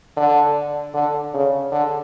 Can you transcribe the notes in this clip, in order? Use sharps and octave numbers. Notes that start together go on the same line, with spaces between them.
D3
D3
C#3
D3